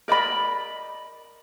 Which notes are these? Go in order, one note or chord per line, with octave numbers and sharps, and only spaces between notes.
A#4 D5 D#5 B5